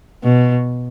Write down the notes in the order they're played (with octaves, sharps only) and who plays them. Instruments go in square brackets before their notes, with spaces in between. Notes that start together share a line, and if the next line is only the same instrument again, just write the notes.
[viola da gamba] B2